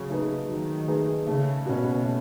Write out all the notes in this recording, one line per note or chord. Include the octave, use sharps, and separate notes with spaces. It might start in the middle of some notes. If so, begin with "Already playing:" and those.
Already playing: C#3 F#3
A3 D#4 G#4 B4
D#3 F#3
A3 D#4 G#4 B4
C#3 A3
B2 C#4 F#4
A3